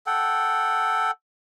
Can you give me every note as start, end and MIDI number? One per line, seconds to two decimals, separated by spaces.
0.07 1.11 69
0.07 1.11 78
0.07 1.11 79